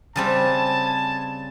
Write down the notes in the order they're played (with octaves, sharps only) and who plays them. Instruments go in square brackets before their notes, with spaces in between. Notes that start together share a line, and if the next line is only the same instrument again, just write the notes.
[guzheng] C#3 G3 C4 [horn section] G#5 A5